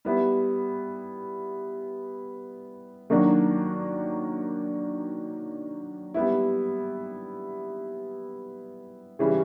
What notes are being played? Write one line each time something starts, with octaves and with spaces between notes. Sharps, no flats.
G3 B3 E4
D#3 F#3 A#3 D4 F#4
G3 B3 E4
C#3 E3 G3